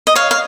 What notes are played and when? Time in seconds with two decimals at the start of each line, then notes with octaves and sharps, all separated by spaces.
0.07 D#5
0.16 C#5 F5
0.31 F5